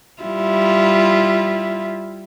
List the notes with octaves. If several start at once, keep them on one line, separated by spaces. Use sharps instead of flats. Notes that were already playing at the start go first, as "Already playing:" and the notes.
G3 E4 F4